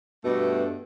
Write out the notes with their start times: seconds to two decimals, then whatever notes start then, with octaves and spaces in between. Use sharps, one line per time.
0.24 G2 B2 A3